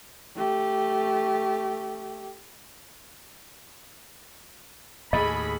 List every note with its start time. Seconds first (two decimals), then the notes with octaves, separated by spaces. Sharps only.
0.36 A3 G4
5.13 D#2 A2 G#4 D#5 B5